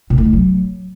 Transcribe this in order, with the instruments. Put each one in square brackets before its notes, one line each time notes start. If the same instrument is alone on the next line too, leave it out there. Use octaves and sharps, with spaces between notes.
[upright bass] A#2
A2
D#3
F#3